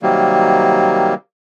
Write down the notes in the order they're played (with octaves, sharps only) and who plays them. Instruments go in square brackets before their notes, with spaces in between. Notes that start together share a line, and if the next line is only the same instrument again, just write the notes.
[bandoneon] C3 D#3 F#3 G3 A#3